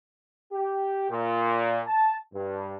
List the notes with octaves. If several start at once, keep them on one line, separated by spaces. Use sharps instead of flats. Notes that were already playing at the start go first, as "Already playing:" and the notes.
G4
A#2
A5
G2